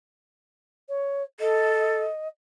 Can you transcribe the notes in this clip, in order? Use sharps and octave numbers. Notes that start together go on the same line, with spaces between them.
C#5
A4 D#5